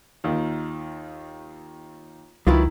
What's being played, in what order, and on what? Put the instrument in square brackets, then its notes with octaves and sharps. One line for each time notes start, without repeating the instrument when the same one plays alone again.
[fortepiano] D#2 D#3 F4
[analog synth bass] C#2 [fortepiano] D#3 E4 [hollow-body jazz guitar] F#3 F4 B4